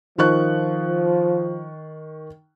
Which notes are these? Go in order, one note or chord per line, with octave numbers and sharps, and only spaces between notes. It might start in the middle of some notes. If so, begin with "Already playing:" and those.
D#3 F3 C#6 F#6